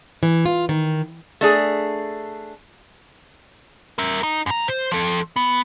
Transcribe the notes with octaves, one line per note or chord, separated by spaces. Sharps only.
E3
F4
D#3
A3 D4 G#4
A#4 E5
D#4
F#2 A#5
C5
F3 A4
B3